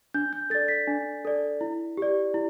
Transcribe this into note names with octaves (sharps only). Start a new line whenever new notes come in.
D4 G6
G6
A4 D5 A6
B6
D4
A4 D5
E4
G4 D5
E4